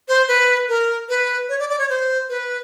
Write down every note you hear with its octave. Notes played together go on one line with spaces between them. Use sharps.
C5
B4
A#4
B4
C#5
D5
D5
C#5
C5
B4